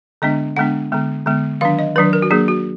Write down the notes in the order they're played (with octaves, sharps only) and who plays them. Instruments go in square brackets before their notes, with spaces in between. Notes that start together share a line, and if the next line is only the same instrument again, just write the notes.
[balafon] D3 G#3 B3 D4 D#5
D3 G#3 B3 D4 F#5
D3 G#3 B3
D3 G#3 B3
D#3 F#3 D4 F5
D#5
D#3 F#3 D4 B4
A#4
F#4
F#3 A#3 D4 G#4
F#4